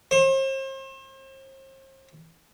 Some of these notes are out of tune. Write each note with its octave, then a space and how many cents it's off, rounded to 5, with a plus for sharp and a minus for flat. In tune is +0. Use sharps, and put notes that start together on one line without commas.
C5 +40